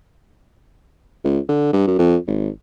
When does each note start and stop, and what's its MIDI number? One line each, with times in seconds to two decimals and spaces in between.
1.24 1.39 37
1.49 1.73 50
1.73 1.87 43
1.87 1.94 42
1.99 2.16 41
2.27 2.48 32